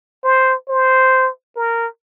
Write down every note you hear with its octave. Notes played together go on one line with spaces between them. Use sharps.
C5
C5
A#4